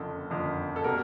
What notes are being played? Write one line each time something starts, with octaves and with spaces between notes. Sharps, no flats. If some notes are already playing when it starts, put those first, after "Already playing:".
Already playing: F#1 F2 D3 A4
F#1 F2 D3
A4
B2 G3 A#3 A#4